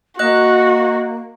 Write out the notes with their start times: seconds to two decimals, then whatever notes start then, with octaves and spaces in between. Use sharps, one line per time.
0.19 A#3 F#4 D#5 F#6